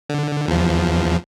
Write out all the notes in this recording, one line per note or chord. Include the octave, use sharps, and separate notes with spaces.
D3
E2 F3